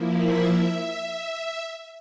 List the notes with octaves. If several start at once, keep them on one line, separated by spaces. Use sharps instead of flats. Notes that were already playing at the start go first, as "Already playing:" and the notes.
Already playing: F3 A#3 E4
E5
E5